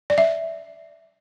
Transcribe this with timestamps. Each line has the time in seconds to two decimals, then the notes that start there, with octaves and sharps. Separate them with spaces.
0.10 D5
0.18 E5